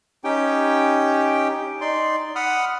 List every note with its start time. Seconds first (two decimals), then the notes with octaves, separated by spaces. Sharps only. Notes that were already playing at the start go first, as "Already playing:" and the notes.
0.24 C#4 D#4 G4 G5
1.81 D#4 D5 C6
2.36 F#5 B5 D#6 F6